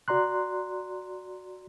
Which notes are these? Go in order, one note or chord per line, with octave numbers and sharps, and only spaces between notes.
F#4 D5 A#5 C6 F#6